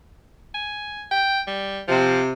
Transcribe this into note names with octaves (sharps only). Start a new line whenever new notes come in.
G#5
G5
G3
C3 F3